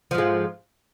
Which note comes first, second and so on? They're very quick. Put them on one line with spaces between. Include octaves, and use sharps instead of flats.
F3 G#2 G#3